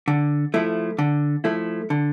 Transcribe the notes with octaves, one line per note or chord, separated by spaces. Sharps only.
D3
F3 A3 E4
D3
F3 A3 E4
D3